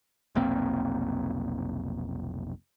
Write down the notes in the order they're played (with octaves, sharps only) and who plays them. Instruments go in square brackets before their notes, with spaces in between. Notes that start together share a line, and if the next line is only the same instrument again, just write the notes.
[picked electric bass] F1 B1 A#3 C4